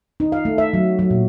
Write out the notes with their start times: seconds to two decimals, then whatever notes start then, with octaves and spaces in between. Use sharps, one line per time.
0.20 D#4
0.32 F5
0.45 A3
0.58 E5
0.73 F#3
0.99 F#3
1.10 A#2